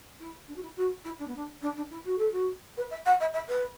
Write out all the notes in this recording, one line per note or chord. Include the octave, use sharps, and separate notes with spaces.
E4
D4
F#4
E4
F#4
E4
D4
B3
D4
D4
D4
E4
F#4
A4
F#4
B4
E5
F#5
E5
E5
B4